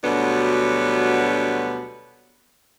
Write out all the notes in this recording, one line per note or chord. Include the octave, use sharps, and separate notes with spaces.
D2 B2 F#3 G3 B3 D4